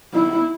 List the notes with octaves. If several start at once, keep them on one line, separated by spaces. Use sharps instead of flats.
E4